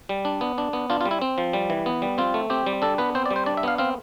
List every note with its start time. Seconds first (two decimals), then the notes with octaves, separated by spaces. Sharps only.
0.09 G3
0.25 D4
0.41 B3
0.58 D4
0.73 B3
0.90 D4 F4
1.01 F4
1.06 G3
1.11 E4
1.22 C4
1.38 F3
1.53 G3
1.70 E3
1.86 B3
2.02 G3
2.18 C4 F4
2.34 A3
2.50 C4 G4
2.66 G3
2.82 D4 A4
2.98 B3 B4
3.15 C4 C5
3.26 D5
3.30 G3
3.36 C5
3.46 D4 D5
3.57 E5
3.63 B3 F5
3.78 C4 F5